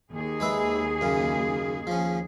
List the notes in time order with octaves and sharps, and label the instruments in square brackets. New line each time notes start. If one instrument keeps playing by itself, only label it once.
[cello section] D#2 G#4
[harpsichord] G#3 B4 E5
F#2 C#3
F3 C#4